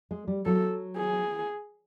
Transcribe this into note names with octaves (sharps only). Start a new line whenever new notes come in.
G#3
G3
F#3 A4
G#4